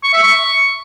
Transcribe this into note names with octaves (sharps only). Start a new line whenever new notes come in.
C#6
E5
C#6